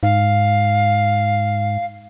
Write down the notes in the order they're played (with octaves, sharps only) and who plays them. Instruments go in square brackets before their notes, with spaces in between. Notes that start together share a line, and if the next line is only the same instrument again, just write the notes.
[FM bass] G#2 [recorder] F5